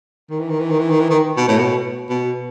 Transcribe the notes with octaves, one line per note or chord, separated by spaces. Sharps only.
D#3
E3
D#3
E3
D#3
E3
D#3
E3
D#3
B2
A2
B2
B2